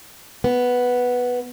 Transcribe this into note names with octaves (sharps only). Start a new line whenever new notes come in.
B3